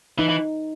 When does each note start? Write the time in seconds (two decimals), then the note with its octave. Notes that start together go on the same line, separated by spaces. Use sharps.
0.18 E3 D#4
0.29 E3